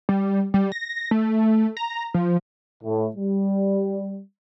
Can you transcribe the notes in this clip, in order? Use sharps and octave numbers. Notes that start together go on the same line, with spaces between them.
G3
G3
A#6
A3
A#5
F3
A2
G3